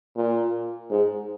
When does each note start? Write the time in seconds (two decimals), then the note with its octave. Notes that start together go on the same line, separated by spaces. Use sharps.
0.16 A#2
0.90 G#2